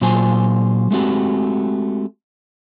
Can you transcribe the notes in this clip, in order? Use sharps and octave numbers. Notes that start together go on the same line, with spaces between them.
A#2 F#3 F4 C5 G#5
G#3 A3 C4 F#4 G4